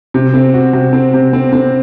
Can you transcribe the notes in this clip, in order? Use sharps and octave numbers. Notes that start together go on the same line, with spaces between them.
C3
C4
F#4
C3
C4
C3
C4
C4